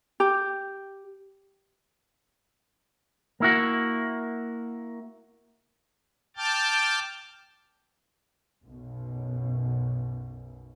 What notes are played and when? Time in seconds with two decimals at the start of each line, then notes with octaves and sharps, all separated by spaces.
0.20 G4
3.40 A#3 E4 F#4
6.37 G5 A5 D6 F6 G6 A6
8.64 B1 F#2 B2